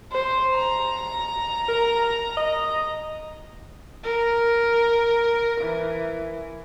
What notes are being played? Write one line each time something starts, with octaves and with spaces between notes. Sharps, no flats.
C5
A#5
A#4
D#5
A#4
E3